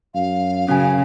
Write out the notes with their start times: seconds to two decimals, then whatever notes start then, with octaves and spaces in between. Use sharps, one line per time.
0.14 F#2 F5
0.68 F#2 C#3 C#4 G#5